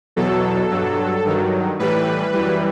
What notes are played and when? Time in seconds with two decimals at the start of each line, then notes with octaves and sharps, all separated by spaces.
0.16 E2 B2 F#3 A4
0.71 G2 F#3
1.25 G2 D#3 F#3
1.79 A2 E3 G3 B4
2.33 F#2 E3 G3